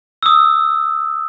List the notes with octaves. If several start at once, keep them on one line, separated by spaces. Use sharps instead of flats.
D#6 E6